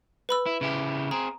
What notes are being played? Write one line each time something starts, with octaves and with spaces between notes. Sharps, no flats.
B4 B5 E6
E4
C#3 E4 G4
C4 G#4 A#5